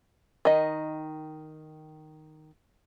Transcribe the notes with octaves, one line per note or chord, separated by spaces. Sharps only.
D#3 D#5